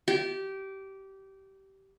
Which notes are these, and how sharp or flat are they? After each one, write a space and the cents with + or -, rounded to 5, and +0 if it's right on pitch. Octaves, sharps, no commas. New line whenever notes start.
G4 -20